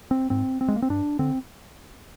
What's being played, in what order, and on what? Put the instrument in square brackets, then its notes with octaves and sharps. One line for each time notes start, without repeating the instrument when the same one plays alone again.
[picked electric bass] C4
G#2 C4
C4
G#3
A#3
C4
G2 D4
D3 C4